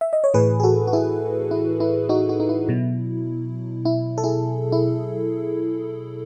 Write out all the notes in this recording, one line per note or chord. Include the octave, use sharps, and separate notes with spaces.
E5
D#5
C#5
A2 E3 G#4 B4
G#4
F#4 A4
F#4
E4 G#4
E4
E4
D#4 F#4
D#4 F#4
D#4
E4
B2 F#3
E4
A4
E4 G#4
E4